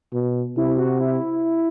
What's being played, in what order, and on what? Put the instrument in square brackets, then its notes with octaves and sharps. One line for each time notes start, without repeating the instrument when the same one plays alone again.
[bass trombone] B2
[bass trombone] C3 [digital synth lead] E4
[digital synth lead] F#4
E4